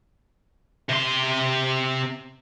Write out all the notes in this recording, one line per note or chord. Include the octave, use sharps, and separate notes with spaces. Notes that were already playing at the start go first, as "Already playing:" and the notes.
C3 C6